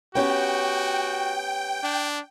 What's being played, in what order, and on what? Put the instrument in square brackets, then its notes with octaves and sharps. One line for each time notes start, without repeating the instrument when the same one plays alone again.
[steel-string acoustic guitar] B3 C#4 G4 [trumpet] F#4 [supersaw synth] G5
[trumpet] D4